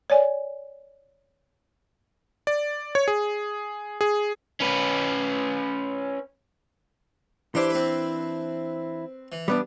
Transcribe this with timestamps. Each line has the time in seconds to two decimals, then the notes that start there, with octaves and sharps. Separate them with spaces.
0.10 C#5 D5 G#5
2.47 D5
2.95 C#5
3.08 G#4
4.01 G#4
4.60 C#4 B4
7.55 E3 D4 E4 G4 C5 D6
7.70 C4 B4
9.32 E3
9.48 G3 B3 D4